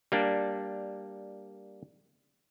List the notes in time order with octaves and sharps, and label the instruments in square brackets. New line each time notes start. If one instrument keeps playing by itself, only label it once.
[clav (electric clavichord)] G3 A#3 D4